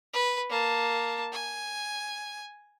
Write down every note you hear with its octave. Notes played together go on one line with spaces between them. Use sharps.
B4
A#3 A5
G#5